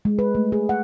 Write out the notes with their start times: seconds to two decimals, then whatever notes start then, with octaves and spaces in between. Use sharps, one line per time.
0.05 G#3
0.19 B4
0.35 A3
0.52 G#4
0.69 F#5